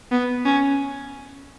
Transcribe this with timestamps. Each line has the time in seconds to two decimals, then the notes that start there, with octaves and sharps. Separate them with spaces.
0.11 B3
0.45 C#4